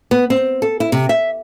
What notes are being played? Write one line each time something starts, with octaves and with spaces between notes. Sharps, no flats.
B3
C4
A4
E4
C3
E5